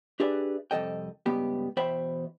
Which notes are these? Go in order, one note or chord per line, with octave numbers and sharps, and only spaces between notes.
D4 G4 G#4 B4 D5 E5
C2 F2 D#3 A4 D#5 G5
C#2 G2 B3 G4
E2 B2 C5 E5 G5 B5